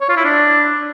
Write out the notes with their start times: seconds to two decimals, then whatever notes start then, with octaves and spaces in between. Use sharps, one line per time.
0.01 C#5
0.09 F4
0.17 E4
0.25 D4